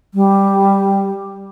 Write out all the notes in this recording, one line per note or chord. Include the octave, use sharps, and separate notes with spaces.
G3